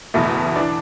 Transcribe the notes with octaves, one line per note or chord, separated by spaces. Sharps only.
F#1 E2 B2 A3
E3 D4